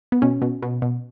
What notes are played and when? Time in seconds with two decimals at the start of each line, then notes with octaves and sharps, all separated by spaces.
0.12 B3
0.22 B2 C#4
0.42 B2
0.62 B2
0.82 B2